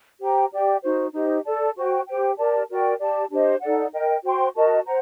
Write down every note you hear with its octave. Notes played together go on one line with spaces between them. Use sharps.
G4 C5 G5 A#5
G4 D5 G5
D#4 F#4 C5
D#4 G4 C5 D#5
A4 D5 A5
F#4 C5 G5
G4 C5 G5
G4 A#4 D5 A5
F#4 A#4 D5 G5
G4 D5 A5
D4 G4 C5 D#5
D#4 A4 D5 F#5
A#4 D#5 G5
F#4 C5 G5 C6
F#4 A#4 D#5 A5
C5 F#5 A#5